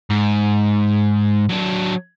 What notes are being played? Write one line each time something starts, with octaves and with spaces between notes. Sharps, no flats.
G#2
F#3 D4